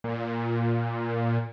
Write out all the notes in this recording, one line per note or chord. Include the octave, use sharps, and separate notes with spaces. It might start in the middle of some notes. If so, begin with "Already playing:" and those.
A#2